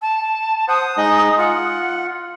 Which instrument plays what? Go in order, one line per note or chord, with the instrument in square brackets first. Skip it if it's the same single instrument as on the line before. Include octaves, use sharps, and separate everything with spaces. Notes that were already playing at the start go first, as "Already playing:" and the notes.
[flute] A5
[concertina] C5 F#5 [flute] D#6
[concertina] G#3 D#4 D#5
[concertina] F4 [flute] F#5